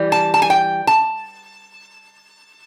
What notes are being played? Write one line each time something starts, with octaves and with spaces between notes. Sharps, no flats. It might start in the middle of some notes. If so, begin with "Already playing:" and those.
Already playing: E3 G3
A5
A5
G#5
G5
A5